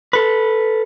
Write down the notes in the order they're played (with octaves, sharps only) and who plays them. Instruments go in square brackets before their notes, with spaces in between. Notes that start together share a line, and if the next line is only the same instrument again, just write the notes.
[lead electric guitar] A4 B4